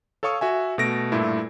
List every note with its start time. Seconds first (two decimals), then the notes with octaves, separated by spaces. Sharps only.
0.23 A4 C#5 F5 C#6 D#6
0.41 F#4 E5 G#5
0.78 B2 A3 A#6 D7
1.12 G2 A#2 A3 E4